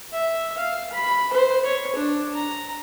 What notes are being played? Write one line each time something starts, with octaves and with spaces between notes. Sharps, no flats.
E5
F5
B5
C5
C#5
D4
A#5